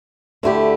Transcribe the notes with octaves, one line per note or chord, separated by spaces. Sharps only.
D2 D3 A3 E4 G4